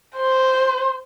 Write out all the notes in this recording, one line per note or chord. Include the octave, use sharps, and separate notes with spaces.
C5